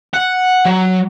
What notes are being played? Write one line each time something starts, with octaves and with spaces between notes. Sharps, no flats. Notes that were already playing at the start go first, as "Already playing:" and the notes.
F#5
F#3